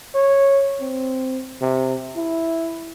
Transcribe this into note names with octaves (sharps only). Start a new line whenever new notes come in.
C#5
C4
C3
E4